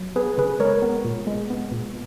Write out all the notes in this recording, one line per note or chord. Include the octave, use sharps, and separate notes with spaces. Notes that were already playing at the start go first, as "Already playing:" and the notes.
Already playing: F#3
B3 G#4 B4
C#3 G#4 B4
G#3 A#4 C#5
B3
A#2
G#3
B3
A#2